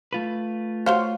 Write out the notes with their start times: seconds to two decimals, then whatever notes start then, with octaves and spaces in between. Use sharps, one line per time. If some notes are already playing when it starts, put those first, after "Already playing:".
0.13 A3 F4 B4
0.86 F#4 C5 C#5 F5